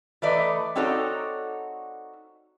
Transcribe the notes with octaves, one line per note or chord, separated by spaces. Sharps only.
E3 A3 B4 D5 D#5
C4 D#4 F#4 A4 C#5 D5